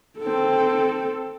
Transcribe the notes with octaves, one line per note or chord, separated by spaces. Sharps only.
C4 A4